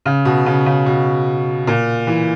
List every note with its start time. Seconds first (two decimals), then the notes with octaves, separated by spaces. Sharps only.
0.06 C#3
0.25 B2
0.46 C#3
0.66 C#3
0.86 B2
1.67 A#2
2.07 E3